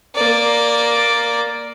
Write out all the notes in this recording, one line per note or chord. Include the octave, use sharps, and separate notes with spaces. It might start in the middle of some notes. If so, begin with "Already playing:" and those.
A#3 D5